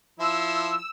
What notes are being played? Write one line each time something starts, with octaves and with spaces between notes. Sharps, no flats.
F3 E4 E6